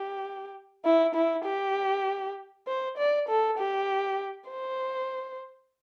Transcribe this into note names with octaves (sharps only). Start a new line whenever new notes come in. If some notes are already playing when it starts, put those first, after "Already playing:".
Already playing: G4
E4
E4
G4
C5
D5
A4
G4
C5